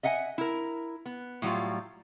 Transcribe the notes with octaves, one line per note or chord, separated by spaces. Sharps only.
D#5 E5 F#5 G#5
E4 A#4
B3
A2 F#3 G3 F4